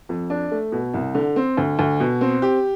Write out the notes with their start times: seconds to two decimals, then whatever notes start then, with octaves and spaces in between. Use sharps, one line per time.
0.09 F2
0.30 D4
0.51 A3
0.72 B2
0.94 C2
1.15 D3
1.36 C4
1.57 D2
1.79 D2
2.00 B2
2.21 C4
2.42 G4